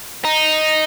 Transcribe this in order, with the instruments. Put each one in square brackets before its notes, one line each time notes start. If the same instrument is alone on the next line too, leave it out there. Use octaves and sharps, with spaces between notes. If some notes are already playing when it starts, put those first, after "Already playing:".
[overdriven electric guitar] D#4